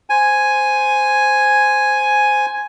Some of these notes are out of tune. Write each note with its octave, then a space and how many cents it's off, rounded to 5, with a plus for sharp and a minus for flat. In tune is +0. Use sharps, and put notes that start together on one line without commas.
C5 -5 G#5 +0